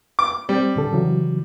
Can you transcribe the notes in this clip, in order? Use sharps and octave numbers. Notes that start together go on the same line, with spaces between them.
D6
G3 C4
A2 D3 A4
C#3 E3 F#3